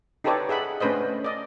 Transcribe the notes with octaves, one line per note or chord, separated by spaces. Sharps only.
D#4 G4 A4 B4 C#5 D5
G#4 E5 F#5 B5
A3 C#4 D4 B4 C5 D#5
D5 D#5